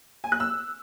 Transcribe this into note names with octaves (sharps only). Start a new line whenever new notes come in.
G#5
F#6
E6